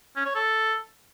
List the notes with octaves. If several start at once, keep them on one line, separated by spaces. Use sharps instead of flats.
C#4
C#5
A4